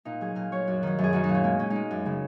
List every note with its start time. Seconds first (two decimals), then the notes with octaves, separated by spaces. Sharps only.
0.05 A#2 D#4
0.21 F#3 G#4
0.35 A#2 A#4
0.52 F#3 C#5
0.67 F#2 F#4
0.83 D#3 F#3
0.99 F#2
1.04 G#4
1.13 D#3 F#3 F#4
1.24 D#4
1.29 A#2
1.35 C#4
1.44 G#3 A#3
1.59 A#2 C#4
1.70 G#3 D#4
1.91 F#2
2.06 C#3 G#3